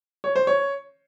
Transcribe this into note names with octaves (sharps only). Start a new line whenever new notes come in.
C#5
C5
C#5